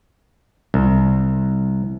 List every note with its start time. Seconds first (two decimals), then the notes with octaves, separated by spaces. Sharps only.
0.74 C2